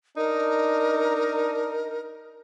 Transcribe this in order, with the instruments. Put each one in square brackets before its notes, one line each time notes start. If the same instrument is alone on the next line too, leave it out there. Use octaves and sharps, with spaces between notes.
[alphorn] D4 [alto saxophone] D#4 [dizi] A#4